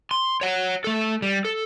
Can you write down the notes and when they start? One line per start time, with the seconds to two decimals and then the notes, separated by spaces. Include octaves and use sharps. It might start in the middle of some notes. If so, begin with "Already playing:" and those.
0.11 C6
0.41 C#5 F#5
0.84 A3 A4
1.22 G3
1.45 A4